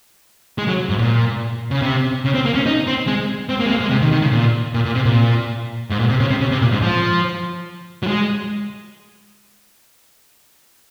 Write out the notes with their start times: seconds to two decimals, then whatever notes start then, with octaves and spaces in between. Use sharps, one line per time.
0.58 G#3
0.68 F#3
0.89 G#2
0.99 A#2
1.71 C#3
1.82 C3
2.25 C#3
2.34 C4
2.45 A#3
2.55 C#4
2.66 D#4
2.87 C4
3.07 G#3
3.49 C4
3.60 A#3
3.66 G#3
3.70 A#3
3.81 G#3
3.91 C3
4.02 D#3
4.12 D#3
4.22 C#3
4.32 A#2
4.74 A#2
4.85 A#2
4.95 C3
5.05 A#2
5.90 G#2
6.00 A#2
6.10 C3
6.20 C#3
6.30 C3
6.41 C#3
6.51 C3
6.61 A#2
6.72 G#2
6.82 F3
8.03 F#3
8.07 G#3